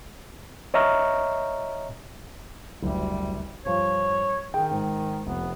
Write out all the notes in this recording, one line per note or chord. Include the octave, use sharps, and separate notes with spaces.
C#5 D#5 E5 A#5 C#6 F6
F#1 D2 G3
G2 F3 C#5
D#3 G#4 G5
G#2
F1 B3